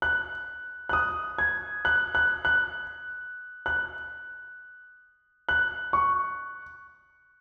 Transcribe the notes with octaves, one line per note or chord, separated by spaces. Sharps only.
F#6
F#6
D#6
G#6
F#6
F#6
F#6
F#6
F#6
C#6